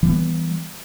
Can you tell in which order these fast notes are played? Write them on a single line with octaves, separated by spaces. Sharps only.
E3 G3 B3